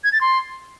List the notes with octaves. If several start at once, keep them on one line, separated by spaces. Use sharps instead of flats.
G#6
A6
C6